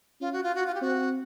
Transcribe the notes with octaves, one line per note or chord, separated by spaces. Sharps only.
C#4 F4
F#4
F4
F#4
F4
G4
C4 F#4